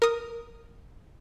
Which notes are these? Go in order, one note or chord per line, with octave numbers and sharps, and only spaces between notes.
A#4 D#6